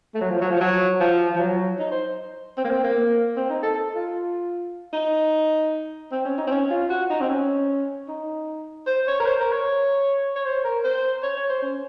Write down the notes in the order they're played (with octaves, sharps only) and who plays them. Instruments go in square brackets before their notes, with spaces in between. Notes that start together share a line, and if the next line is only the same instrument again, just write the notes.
[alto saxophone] A3
F#3
F3
F#3
F3
F#3
F3
F3
F#3
D#4
C5
C4
A#3
C4
A#3
C4
D#4
A4
A4
F4
D#4
C4
C#4
D#4
C4
C#4
F4
F#4
D#4
C4
C#4
D#4
C5
C#5
A#4
C5
A#4
C#5
C#5
C5
A#4
C5
C#5
C#5
C5
C#4